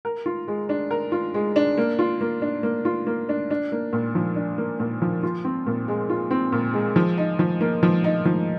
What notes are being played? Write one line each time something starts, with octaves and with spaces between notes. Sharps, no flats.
A#4
F4
G#3
D4
A#4
F4
G#3
D4
A#3
F4
A#3
D4
A#3
F4
A#3
D4
D4
A#3
A#2
F3
D4
A#3
A#2
F3
F4
C4
A#2
G#3
F4
C4
A#2
G#3
F3
D#4
F3
A#3
F3
D#4
F3